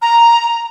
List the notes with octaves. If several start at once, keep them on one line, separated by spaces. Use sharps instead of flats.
A#5